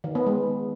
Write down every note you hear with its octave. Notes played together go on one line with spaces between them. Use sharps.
D#3
B3
G#3